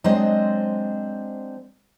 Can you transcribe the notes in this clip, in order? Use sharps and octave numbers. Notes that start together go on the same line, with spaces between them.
F#3 G#3 C4 D4 C5 D#5